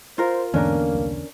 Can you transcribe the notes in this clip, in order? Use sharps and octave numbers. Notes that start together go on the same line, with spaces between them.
F4 A#4 C5
E2 G#2 D3 A#3 C#4 D4 A#4
C2